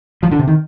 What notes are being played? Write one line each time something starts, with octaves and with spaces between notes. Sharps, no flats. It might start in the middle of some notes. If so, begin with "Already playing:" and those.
F3
D3
C3
D#3